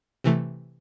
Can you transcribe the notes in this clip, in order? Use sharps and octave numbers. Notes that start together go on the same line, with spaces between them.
C3 E3 A3